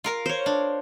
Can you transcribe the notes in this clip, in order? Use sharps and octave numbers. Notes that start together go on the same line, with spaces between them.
F4 A#4 F5
C5 C#5
D4